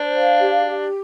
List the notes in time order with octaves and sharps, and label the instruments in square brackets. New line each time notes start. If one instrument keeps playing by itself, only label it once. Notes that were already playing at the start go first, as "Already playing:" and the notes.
Already playing: [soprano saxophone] D4 [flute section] C5
[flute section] F5
G4
G4